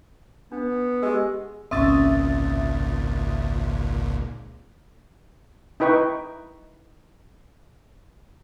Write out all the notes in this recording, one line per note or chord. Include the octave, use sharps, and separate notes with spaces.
B3 D4
G#3 G4 E6
G#1 C#2 A#2 C4 C#4 E5 D#6 A6
D#4 E4 B4 G5 C#6